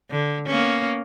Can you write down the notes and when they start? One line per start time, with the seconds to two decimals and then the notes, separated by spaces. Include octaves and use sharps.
0.10 D3
0.46 A#3 B3 C#4